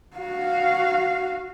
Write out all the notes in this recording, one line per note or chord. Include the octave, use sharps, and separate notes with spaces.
F#4 F5